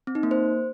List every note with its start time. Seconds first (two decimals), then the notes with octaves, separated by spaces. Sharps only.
0.07 C4
0.15 D#4
0.23 A#3
0.31 C5